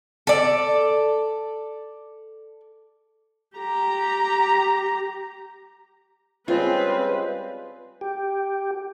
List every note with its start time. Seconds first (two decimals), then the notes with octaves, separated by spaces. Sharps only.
0.27 A4 D5
3.57 G4 A#5
6.48 C#3 G3 G#3 C4 F4 B4
8.01 G4